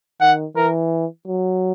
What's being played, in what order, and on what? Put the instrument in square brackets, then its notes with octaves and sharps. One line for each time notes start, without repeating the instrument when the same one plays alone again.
[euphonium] D#3 [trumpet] F#5
[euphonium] E3 [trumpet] A#4
[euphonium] F#3